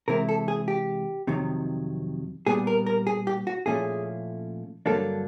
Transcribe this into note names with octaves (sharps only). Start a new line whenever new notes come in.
C3 E3 G#3 C4 E4 A#4
A4
G#4
G4
F2 C3 D#3 F#3
A#2 G3 B3 G#4
A#4
A#4
G#4
G4
F#4
A#2 F3 A3 C#4 E4 G#4
G2 D3 F#3 A#3 D4 A4